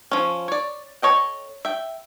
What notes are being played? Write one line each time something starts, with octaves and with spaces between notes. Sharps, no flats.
F3 C#4
C#5 D5
A4 B4 C#5 D#5 G5
E5 G5